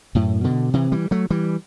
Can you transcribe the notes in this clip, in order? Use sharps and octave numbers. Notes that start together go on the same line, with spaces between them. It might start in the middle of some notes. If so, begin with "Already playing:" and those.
F#2 A2
B2 D3
C3 E3
E3 G3
F#3 A3
E3 G3